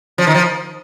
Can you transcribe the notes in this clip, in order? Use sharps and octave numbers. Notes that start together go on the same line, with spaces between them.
F3
D#3
F3